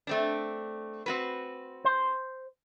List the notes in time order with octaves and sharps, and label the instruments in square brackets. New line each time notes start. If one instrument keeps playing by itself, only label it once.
[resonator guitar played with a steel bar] A3 C4 D4
C4 F#4 B4
[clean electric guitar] C5